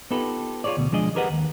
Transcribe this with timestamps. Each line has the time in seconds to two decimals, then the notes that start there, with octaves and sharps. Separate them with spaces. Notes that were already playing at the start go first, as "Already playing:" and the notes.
0.11 B3 D#4 F4 G4 A4 B4
0.64 F4 G#4 B4 C#5 D5
0.77 D2 B2
0.91 B1 F3 G#3 D4 G#4 D#5
1.15 G4 G#4 A#4 B4 D#5 F#5
1.30 D#2